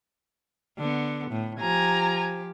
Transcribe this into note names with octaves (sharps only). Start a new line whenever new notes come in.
D3 B3
A2
F3 G4 G#5 A#5